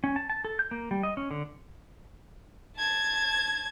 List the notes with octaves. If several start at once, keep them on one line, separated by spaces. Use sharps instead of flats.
C#4
A5
A5
A4
G6
A#3
G3
D#5
C#4
D3
A5 G#6